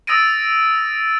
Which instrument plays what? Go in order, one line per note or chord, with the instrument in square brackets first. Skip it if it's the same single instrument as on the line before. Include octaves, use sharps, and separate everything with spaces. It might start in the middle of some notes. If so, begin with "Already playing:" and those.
[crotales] D#6 E6 A6 A#6 D7 D#7